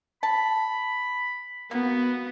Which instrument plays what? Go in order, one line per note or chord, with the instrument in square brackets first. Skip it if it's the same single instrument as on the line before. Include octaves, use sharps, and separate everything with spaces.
[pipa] A5 [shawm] B5
[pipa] A#3 [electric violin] B3 F#4